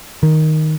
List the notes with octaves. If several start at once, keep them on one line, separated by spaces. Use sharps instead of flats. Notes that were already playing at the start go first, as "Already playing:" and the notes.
D#3